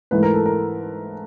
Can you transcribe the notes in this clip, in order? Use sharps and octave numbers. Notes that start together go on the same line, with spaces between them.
G#2 E3 A3 B4
A#4
A4
A#4